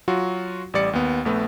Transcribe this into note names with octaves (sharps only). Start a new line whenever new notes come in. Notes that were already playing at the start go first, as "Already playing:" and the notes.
F#3 F4 F#4
A1 G3 D5 C#7
D#2 B3
A#1 A3 B3 B4